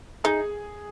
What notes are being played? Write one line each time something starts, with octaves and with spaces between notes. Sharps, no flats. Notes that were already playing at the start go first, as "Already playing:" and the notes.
D#4 G#4